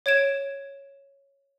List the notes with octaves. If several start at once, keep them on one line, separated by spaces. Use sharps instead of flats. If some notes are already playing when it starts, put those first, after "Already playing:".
C#5 G#6 D7 E7